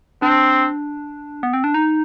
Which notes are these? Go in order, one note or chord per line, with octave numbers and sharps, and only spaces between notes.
C4 D4
B3
C4
D4
D#4